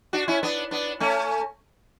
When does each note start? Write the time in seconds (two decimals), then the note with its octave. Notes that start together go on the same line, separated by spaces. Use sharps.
0.13 D4 F#4
0.28 C#4 E4
0.43 B3 D4
0.71 B3 D4
1.00 A3 C#4